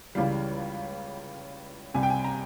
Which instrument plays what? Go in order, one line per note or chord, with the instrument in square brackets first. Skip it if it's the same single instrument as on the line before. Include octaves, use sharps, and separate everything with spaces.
[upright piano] C#2 C#3 E3 G3 F5
C2 C3 G3 G#5
G5
G#5
A#5